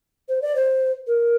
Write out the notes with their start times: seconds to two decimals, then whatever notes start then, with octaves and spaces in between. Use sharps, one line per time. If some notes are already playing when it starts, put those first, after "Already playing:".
0.29 C5
0.42 D5
0.56 C5
1.07 A#4